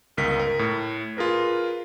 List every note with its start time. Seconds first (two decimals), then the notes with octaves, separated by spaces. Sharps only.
0.17 G1 C#2 A#4 B6
0.40 A#4
0.59 A2
1.17 F4 G#4 A#4 B4